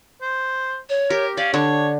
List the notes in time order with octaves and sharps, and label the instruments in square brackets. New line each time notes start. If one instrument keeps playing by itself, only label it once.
[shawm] C5
[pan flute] C#5
[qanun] G4 [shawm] A#4
[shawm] C#4 [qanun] D5 [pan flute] F5
[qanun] D3 [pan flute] D4 [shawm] C#5